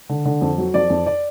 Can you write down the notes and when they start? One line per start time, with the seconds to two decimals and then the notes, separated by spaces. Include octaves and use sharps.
0.09 D3
0.25 D3
0.41 F2
0.58 F#3
0.74 F2 D5
0.90 F2
1.06 D5